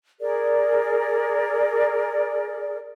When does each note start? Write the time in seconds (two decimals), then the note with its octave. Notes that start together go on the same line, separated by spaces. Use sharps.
0.20 G#4 A#4 D5